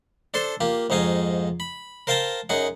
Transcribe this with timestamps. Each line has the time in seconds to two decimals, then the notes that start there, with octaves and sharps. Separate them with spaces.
0.34 D4 A4 C5 C6
0.61 A#3 F4 G4
0.90 F2 G#2 D#4 F5 G#5
1.60 B5
2.07 A#4 C5 F5 G5 A5 A#5
2.49 F#2 D#4 G#4 F#5